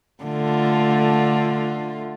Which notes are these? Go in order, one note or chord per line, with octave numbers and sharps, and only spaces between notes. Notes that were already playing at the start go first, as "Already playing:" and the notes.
D3 A3 F4